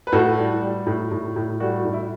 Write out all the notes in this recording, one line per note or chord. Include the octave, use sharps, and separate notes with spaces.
B4
A2 F#4 A4
G3
G3
A2
A2
A2
G3 F#4 A4
F#4
A2
E4